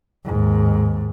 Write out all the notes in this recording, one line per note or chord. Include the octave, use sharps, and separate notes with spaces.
D#2 G#2